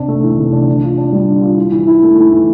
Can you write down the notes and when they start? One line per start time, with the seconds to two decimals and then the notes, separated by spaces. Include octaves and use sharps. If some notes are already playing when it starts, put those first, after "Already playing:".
Already playing: C3 D4
0.08 A3
0.23 E3
0.38 C3
0.53 D4
0.68 D3
0.84 F4
0.98 D4
1.12 G3
1.28 D3
1.42 F4
1.57 E3
1.72 E3
1.87 E4
2.03 A3
2.18 E3
2.32 E3